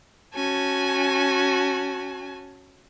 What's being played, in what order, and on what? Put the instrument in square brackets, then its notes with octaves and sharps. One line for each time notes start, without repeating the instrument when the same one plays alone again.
[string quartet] C#4 F#4 G#5 A5